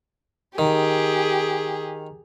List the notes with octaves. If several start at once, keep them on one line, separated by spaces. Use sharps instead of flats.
D#3 G4 G#4